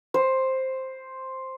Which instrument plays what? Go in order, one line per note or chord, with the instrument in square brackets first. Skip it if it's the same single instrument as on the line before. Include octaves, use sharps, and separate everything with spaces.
[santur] C5